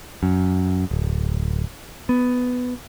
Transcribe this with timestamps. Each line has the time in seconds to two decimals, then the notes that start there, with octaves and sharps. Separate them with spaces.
0.23 F#2
0.91 D1
2.09 B3